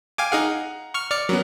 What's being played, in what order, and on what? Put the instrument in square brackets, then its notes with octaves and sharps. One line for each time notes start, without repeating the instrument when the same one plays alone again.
[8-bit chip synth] F5 G#5 D6 [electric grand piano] G5
[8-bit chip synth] D#4 G#4 F5 [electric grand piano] F#5 A#5
[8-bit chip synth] C#6 F6
D5 F6 C#7
[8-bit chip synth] F#3 [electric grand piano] B3 C#4 A#4